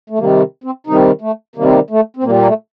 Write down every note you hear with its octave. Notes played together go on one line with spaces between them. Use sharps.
A3
C3 D#3 G3 A#3
C4
C3 D#3 G3 D#4
A3
C3 D#3 G3 A#3
C4
A#3
A3
C4
A#2 G3 A#3
A#3
A3